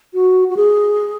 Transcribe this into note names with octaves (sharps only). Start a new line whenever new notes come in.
F#4
F#4
G#4